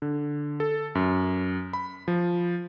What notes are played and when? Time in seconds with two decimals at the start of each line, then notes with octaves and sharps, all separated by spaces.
0.02 D3
0.60 A4
0.95 F#2
1.73 B5
2.08 F3